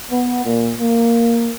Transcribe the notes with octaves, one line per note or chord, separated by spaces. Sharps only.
B3
A#2
A#3